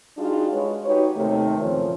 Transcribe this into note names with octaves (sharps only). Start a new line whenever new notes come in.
G3 D4 D#4 F4 F#4 G#4
G#3 B4 C#5
D#4 F#4 G4 B4 C#5
D#2 C3 D#3 A3
F2 A#2 C#3 E3 F3 C#5